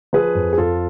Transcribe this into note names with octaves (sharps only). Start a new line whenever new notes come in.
F3 G#4 B4
F2
G#4
F2 F4 A4